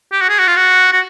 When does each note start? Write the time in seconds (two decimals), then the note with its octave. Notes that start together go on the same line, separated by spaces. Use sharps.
0.12 G4
0.21 F#4
0.29 G#4
0.39 F#4
0.47 F4
0.56 F#4
0.92 F#4